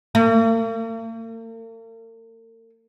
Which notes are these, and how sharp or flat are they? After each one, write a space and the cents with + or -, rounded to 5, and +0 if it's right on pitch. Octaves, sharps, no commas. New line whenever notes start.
A#3 -45